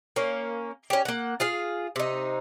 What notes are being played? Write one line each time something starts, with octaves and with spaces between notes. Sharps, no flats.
A#3 C#4
C#4 G4
A#3 F#5
F4 G#4 F5
C3 D#4